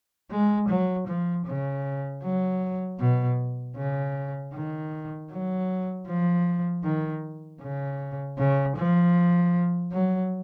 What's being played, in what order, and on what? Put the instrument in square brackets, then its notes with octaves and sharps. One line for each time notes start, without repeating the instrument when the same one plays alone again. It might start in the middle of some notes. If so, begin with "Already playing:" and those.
[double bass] G#3
F#3
F3
C#3
F#3
B2
C#3
D#3
F#3
F3
D#3
C#3
C#3
F3
F#3